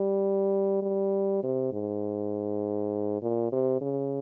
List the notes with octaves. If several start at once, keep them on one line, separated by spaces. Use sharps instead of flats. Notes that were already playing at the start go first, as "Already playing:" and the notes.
Already playing: G3
G3
C3
G#2
A#2
C3
C#3